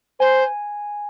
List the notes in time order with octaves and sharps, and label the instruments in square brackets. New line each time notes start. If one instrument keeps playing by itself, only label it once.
[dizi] C5 [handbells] G#5